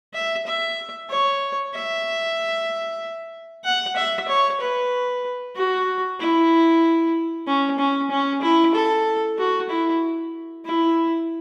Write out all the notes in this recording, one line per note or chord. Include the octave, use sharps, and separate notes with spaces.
E5
E5
C#5
E5
F#5
E5
C#5
B4
F#4
E4
C#4
C#4
C#4
E4
A4
F#4
E4
E4